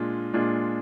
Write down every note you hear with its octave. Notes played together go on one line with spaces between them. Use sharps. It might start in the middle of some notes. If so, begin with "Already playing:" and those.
Already playing: A#2 G#3 D4 F4
A#2 G#3 D4 F4